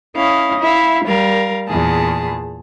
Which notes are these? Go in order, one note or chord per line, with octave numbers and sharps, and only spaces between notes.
C#4 E4 D#5 F5
E4 E5 F5
G3 A#4 F5
E2 A#2 G#4 A5